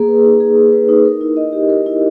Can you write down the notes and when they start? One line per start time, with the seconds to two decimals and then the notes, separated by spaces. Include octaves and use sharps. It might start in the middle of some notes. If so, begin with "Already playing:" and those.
Already playing: A#3 G#4
0.08 B4
0.25 D#4
0.40 G#4
0.56 A#3
0.73 B4
0.89 D#4
1.05 A#4
1.21 E4
1.37 D#5
1.53 G4
1.70 A#4
1.86 E4